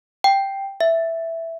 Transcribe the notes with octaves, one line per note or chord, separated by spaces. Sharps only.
G5
E5